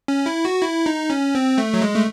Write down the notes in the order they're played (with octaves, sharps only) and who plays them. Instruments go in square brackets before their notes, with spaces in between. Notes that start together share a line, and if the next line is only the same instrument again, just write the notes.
[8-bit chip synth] C#4
E4
F#4
E4
D#4
C#4
C4
A3
F#3
G#3
A3